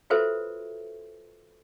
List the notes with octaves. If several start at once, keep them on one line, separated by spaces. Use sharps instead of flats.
F4 F#4 A4 B4 C5 E5